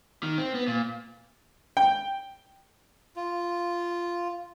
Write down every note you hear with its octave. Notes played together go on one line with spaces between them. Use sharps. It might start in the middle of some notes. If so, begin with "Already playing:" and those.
D#3
C4
B3
A#2
G5
F4